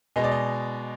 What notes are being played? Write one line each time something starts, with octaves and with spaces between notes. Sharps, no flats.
B2 G#3 D#5
D5
D#5